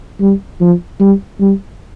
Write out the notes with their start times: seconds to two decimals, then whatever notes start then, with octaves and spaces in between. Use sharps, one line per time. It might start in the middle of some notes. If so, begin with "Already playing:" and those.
0.20 G3
0.60 F3
1.00 G3
1.40 G3